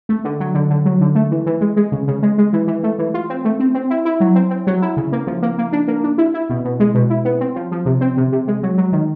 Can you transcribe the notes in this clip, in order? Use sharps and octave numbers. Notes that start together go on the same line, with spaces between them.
A3
D3
F#3
D3
D3
F#3
D3
A3
E3
E3
G#3
G#3
C#3
C#3
G#3
G#3
E3
E3
A3
E3
F4
C4
A3
C4
C4
E4
E4
F#3
C4
C4
F#3
E4
C#3
A#3
F3
A#3
A#3
D4
A#3
D4
E4
E4
B2
B2
G#3
B2
E4
B3
C4
F3
F3
C3
C4
C3
C3
G#3
F#3
F#3
D#3